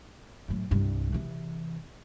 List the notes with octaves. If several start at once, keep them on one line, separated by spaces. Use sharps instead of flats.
F#2 A2
C2 G2
C3 E3